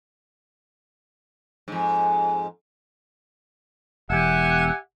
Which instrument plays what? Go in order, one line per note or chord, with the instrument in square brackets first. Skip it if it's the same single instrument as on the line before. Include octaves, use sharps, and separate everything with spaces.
[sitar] F2 G#2
[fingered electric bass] E1 E2 [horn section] G4 E5 G#5 [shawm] F#5